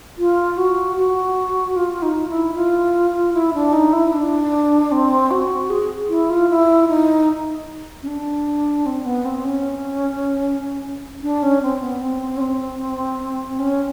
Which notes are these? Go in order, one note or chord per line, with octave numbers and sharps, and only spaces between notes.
F4
F#4
F#4
F4
D#4
E4
F4
E4
D4
D#4
E4
D4
C4
F#4
G#4
E4
F4
E4
D#4
C#4
D4
C4
B3
C4
C#4
D4
C#4
C4
B3
C4
C#4
C4
C#4